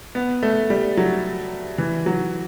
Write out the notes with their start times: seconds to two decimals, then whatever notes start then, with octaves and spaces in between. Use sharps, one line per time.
0.15 B3
0.43 A3
0.70 G3
0.97 F#3
1.78 E3
2.06 F#3